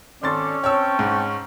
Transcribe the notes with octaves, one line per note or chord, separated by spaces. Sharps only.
G#1 C#4 A4 D5 C6 A6
C4 C#5 G5 A5 E6
G#2